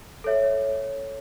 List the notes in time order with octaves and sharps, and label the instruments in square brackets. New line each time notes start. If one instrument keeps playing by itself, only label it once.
[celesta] A4 C#5 E5